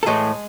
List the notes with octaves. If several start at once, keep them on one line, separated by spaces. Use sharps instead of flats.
A4
A2 E3 G#3 A3 G#4